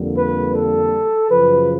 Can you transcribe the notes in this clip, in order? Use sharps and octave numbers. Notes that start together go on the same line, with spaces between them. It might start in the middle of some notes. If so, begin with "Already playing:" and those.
Already playing: F2 D3 G3 A#3
B4
A4
F#2 C#3 F3 B4